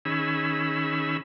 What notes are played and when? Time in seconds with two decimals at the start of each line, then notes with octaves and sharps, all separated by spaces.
0.05 D#3 C#4 G#4 B5 E6